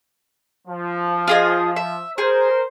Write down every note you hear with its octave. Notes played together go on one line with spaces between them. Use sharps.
F3
F4 G#4 D#5
E5
G#4 A#4 C5